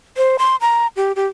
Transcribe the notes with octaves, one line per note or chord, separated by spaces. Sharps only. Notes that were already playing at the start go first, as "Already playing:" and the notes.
C5
C6
A#5
G4
G4